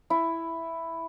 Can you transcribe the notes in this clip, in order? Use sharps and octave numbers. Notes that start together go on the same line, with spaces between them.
E4